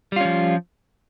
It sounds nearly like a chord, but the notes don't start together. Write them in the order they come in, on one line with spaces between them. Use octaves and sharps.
G3 F4 C#4 F3